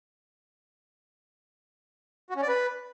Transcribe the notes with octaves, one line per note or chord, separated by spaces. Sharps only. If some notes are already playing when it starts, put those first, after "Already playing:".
F#4
C#4
D5
B4